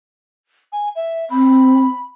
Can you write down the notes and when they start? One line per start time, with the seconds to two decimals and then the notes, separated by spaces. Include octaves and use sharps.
0.72 G#5
0.96 E5
1.30 C4 B5